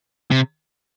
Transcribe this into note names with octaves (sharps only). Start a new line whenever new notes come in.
C3